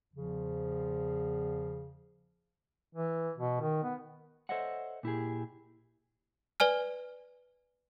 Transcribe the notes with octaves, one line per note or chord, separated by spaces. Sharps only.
E2 C#3 F3
E3
B2
D#3
B3
A4 C5 C#5 D#5 E5 F#5
A#2 E4 G4 G#4
B4 D5 G#5 F6